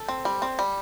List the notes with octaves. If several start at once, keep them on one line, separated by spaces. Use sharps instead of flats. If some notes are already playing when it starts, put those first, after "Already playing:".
Already playing: A4
C4
G3
C4
G3